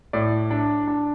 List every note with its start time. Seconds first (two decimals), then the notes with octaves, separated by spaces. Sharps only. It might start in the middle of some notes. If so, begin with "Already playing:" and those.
0.13 A2 D5
0.51 D4
0.87 D4